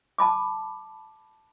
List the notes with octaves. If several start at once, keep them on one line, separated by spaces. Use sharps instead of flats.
A5 B5 D6